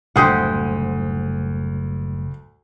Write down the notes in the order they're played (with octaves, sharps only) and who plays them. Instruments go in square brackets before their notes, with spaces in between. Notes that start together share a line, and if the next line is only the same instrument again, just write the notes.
[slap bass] F#1 A2 G3 [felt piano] D2 D#6 [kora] G4 C5 F#5